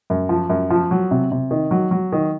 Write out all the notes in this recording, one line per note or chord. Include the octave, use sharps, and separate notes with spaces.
F#2
F3
F#2
F3
F#3
C3
C3
D#3
F#3
F#3
D#3